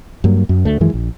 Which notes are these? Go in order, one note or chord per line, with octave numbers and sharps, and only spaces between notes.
G2 F#3 A#3
F#2
D2 A3
F#2 D#3 E3 G#3
A#1